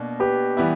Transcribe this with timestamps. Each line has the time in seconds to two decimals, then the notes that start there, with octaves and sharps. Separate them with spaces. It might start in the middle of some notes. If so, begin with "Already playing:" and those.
Already playing: B2 A#3 D4
0.20 G4 B4
0.57 E3 G3 B3 E4